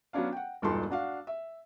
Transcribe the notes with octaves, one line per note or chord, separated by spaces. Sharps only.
F#3 B3 C#4 D4 F5
F#5 G5
E1 G2 A#2 D#4 A4 C6
D4 F#4 F5
E5